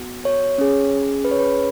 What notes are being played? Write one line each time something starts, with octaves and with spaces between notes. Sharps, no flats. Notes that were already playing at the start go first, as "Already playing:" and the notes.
Already playing: B3 F#4
C#5
C#4 G#4
B4
C#5
B4